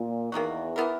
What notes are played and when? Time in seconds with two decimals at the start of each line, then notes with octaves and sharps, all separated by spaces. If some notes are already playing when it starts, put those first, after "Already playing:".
Already playing: A#2
0.32 E2 D#3 A#3 D#4 F#4
0.76 E3 B3 E4 A#4